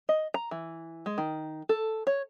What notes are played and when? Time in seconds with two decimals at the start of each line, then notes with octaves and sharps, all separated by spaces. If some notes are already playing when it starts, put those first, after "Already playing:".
0.09 D#5
0.34 A#5
0.51 E3
1.06 G#3
1.18 D#3
1.69 A4
2.07 C#5